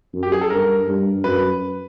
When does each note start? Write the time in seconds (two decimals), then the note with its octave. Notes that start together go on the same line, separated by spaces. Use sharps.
0.13 F#2
0.23 G4
0.32 G#4
0.41 A4
0.50 G2 A#4
0.88 G2
1.24 F#2 B4